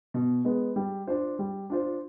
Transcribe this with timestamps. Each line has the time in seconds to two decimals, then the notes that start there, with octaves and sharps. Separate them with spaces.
0.14 B2
0.45 G#3 B3
0.76 G3
1.07 D4 F4 C5
1.39 G3
1.70 D4 F4 C5